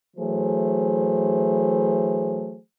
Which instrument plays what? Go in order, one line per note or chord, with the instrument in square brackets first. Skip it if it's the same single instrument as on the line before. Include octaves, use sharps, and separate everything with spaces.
[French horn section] E3 F#3 A3 G#4 C5